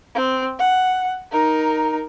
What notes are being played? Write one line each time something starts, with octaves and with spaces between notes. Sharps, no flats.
C4
F#5
D#4 A#4